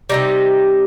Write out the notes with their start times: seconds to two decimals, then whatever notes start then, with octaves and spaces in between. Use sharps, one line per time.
0.09 C3 D#3 G3 D#4